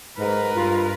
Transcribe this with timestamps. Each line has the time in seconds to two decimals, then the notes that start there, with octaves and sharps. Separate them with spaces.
0.18 G#2 A#4 B4
0.55 G2 F4